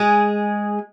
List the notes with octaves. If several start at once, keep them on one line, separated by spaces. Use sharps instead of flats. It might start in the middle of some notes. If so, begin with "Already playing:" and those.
Already playing: G#3 G#4